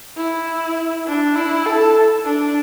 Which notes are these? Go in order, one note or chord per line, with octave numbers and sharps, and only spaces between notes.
E4
D4
E4
A4
D4